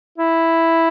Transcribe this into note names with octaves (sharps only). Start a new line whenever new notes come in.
E4